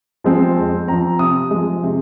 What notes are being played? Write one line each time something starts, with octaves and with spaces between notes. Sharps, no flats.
F3 G#3 C4
F2
F3 C4 A#5
C3 D#6
F3 G#3
C3